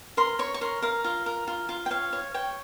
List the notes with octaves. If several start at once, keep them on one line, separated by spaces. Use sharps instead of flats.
A#4 C6
C#5 C#6
C#6
A#4 C6
A#4 F5
F4
A#4
F4
F4
G5
C#5 F5
C#5
C#5 G5